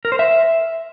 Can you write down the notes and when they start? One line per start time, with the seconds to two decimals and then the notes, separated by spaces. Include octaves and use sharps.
0.05 A#4
0.12 C5
0.19 E5